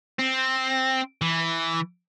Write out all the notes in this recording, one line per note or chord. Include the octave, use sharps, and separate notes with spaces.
C4
E3